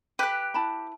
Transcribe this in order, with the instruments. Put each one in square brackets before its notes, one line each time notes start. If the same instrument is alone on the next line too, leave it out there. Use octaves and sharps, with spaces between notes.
[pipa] G4 [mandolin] B4 F#6
[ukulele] E4 A5 B5